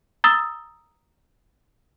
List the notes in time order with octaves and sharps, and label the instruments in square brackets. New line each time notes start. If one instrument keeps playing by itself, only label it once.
[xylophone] A#5 D#6 E6 A6 G7